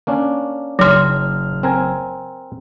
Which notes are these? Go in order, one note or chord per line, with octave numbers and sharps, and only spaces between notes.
A#3 C#4 D4
F#1 F#3 C6 F6
C4 A#4 G#5